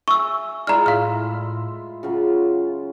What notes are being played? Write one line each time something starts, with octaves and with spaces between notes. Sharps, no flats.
E5 G#5 C#6 E6
G#3 E4 F4 D5 A#5 F6
A2 F5 F6
C#3 F#3 F4